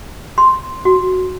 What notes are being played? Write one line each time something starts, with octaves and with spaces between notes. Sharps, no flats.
C6
F#4